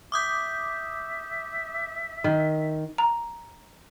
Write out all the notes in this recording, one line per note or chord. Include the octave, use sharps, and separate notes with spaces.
E5 D6 D#6 G6
D#3
A#5